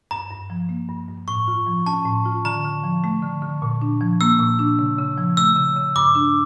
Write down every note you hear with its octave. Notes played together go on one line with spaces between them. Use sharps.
G2 A#5
G2
F3
A#3
G2
G2
A2 C#6
F4
F3
C#4 A5
A2
F4
D3 A#5
D3
F3
A3
D3
D3
A#2
D4
F3
A#3 E6
A#2
D4
C#3
C#3
F3
A3 E6
C#3
C#3
G2 D6
D4